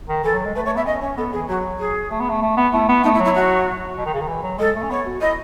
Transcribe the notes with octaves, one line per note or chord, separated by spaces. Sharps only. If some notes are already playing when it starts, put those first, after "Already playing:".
D#3
E3 A4
F#3
G#3
A3 B4
A3 C#5
B3 E5
C#4 D#5
C#4 C#5
B3 A4
E3 G#4
F#3 F#4
G#4
A3
B3
A3
A3
B3
A3 E4
B3
A3 D#4
E4
F#3
E4
F#4
B2
D#3
C#3
D#3
E3
F#3
G#3 A4
A3
C#4
B3 C#5
F#4
E4 D#5